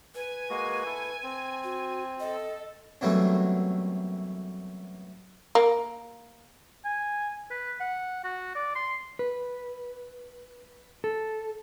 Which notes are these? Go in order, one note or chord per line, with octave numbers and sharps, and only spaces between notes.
B4 G#5
G#3 A#3 F#4
E4 A4
C4
F#4
A4 D#5
C2 F#2 B2 E3 F#3 A3
A#3
G#5
B4
F#5
F#4
D5
C6
B4
A4